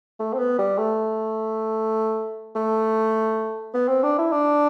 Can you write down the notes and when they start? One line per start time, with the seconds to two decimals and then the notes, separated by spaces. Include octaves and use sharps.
0.20 A3
0.33 C4
0.39 B3
0.59 G3
0.78 A3
2.55 A3
3.74 B3
3.88 C4
4.03 D4
4.19 E4
4.32 D4